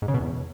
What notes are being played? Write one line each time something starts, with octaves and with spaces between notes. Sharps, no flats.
G#2
C#3
B2
E2